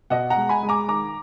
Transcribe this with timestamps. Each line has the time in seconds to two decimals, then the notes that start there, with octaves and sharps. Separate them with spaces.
0.10 B2 D#5 F#5
0.30 F#5 A#5
0.36 G#3
0.49 G#5 B5
0.63 G#3
0.69 A#5 D6
0.89 D#3 A#5 D6